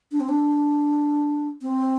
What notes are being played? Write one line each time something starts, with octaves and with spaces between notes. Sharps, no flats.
D4
C4
D4
C4